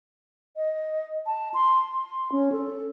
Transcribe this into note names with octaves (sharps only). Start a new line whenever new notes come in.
D#5
A5
C6
C6
C#4
A4